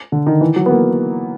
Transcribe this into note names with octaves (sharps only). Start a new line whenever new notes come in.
D3
D#3
E3
F#3
B3
A#3